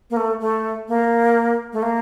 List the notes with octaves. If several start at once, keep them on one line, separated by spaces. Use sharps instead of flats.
A#3
A3
A3
A#3
A3
A#3